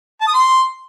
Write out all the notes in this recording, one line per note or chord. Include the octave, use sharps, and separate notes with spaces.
A5
D#6
C6